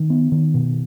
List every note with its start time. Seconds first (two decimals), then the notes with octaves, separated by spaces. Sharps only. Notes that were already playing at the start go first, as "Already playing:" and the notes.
Already playing: D#3
0.10 B3
0.32 D#3
0.54 B2